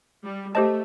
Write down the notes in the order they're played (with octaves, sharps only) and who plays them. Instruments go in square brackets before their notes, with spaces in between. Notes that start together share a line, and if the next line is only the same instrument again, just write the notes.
[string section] G3
[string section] A3 [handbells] G4 C5 D#5 A5